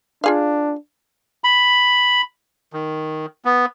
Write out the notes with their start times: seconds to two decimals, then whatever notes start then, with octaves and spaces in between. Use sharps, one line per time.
0.24 D4 F4 G#4 F5
1.44 B5
2.73 D#3
3.45 B3